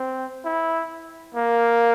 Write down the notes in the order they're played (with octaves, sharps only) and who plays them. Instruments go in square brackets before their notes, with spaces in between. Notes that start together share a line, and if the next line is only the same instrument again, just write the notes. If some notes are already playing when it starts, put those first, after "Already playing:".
Already playing: [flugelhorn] C4
E4
A#3